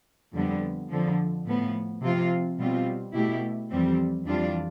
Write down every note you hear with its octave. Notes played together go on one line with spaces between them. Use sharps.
F2 D3 G3 B3
F2 D3 F3
A2 F3 B3
C3 F3 C4 F4
B2 G3 C4 F4
B2 A3 E4 G4
F2 E3 G3 C4
F2 E3 G3 D4 F4